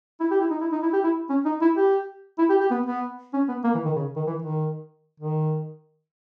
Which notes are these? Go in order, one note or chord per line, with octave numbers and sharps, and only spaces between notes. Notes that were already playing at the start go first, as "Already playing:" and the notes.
E4
G4
E4
D#4
E4
D#4
E4
G4
E4
C#4
D#4
E4
G4
E4
G4
G4
B3
B3
C#4
B3
A#3
E3
D#3
C#3
D#3
E3
D#3
D#3